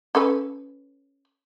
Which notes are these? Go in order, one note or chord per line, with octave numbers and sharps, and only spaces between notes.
C#4 A4 B4